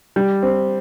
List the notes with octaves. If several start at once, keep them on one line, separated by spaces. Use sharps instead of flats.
G3
C4